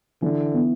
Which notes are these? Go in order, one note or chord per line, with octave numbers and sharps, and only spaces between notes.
D3 E3
B3